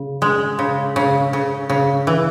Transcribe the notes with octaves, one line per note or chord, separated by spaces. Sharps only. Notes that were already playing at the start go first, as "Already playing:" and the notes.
Already playing: C#3
G#3
C#3
C#3
C#3
C#3
E3